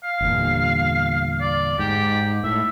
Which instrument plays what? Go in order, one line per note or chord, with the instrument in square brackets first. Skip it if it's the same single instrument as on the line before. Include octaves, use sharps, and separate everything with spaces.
[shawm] F5
[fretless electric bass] G1 E2 A#2
[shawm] D5
[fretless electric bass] G#2 [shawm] G4
[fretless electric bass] A2 [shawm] E5